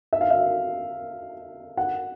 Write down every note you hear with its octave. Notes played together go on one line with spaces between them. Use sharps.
E5
F5
E5
F#5